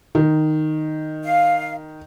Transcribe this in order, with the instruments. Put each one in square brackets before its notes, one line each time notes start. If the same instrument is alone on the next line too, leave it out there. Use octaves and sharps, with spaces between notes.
[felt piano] D#3
[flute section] F5